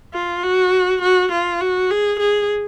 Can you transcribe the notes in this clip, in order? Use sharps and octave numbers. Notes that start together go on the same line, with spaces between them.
F4
F#4
F#4
F4
F#4
G#4
G#4